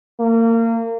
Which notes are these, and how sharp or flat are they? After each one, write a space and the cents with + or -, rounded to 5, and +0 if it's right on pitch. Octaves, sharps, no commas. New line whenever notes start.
A#3 -30